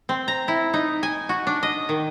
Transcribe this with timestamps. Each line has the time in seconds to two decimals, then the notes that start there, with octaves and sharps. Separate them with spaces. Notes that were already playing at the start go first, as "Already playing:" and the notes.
0.09 C4
0.28 A#5
0.48 E4
0.74 D#4
1.03 G#5
1.29 F#4
1.47 D4
1.63 D#5
1.89 D#3